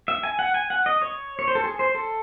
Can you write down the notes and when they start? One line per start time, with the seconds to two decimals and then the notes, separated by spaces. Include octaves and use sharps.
0.08 E5
0.23 G#5
0.39 F#5
0.54 G#5
0.70 F#5
0.86 D#5
1.02 C#5
1.39 C#5
1.48 C5
1.55 A4
1.64 G#4
1.79 C5
1.95 A4